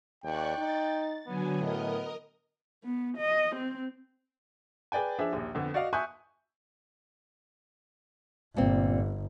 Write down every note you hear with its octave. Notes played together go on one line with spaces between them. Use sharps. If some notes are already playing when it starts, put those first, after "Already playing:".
D#2 D5 G5 C#6 F#6
D#4 A6
D3 F#3 B3 G#5
A2 A#4 D#5
B3
D#5
C4
G#4 B4 D5 G5 G#5
F3 D4 G#4 E5
A#1 D#2
F2 D3 B3
F#4 D5 D#5 F5 F#5
E5 G#5 C#6 D#6 F#6 G6
G1 A#2 C4